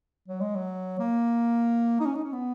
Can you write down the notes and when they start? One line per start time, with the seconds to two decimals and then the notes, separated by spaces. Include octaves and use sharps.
0.28 F#3
0.41 G#3
0.55 F#3
0.99 A#3
2.00 D#4
2.06 C#4
2.15 D#4
2.24 C#4
2.33 B3